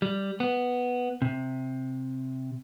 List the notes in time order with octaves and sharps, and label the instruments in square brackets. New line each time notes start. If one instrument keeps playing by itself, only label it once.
[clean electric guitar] G3
B3
C3